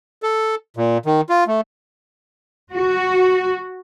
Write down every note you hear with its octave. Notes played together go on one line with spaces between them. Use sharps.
A4
A#2
D#3
F4
A3
F#4